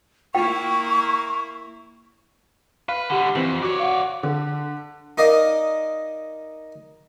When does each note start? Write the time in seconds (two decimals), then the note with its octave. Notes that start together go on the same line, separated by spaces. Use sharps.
0.35 A#3 E4 G5 C#6
2.89 B4 F5
3.10 D3 G3 G4 F#5
3.35 F2 E3 C4 F#7
3.63 F#4 C#5 D5
3.79 F5 F#5
4.23 D3
5.18 D#4 A#4 D5 D#5 F5 D#6